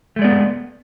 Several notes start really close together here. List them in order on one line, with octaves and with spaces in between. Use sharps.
A3 G#3 D5 B3